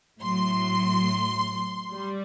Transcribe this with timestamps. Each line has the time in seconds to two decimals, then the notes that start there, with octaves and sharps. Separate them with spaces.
0.21 A2 F#3 C6
1.94 G3